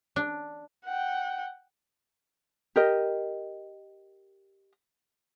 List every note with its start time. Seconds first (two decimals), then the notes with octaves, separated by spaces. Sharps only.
0.16 D4
0.85 F#5 G5
2.76 G4 A#4 D#5